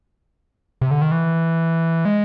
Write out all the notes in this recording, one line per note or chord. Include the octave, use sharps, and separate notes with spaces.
C3
D3
D#3
E3
G#3